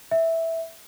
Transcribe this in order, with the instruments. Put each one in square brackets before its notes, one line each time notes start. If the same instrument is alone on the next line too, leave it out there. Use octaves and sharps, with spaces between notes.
[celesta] E5